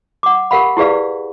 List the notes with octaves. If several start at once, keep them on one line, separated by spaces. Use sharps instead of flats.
F#5 D6
G4 A#4 F5 F#5 B5
E4 G4 G#4 B4 D5 F5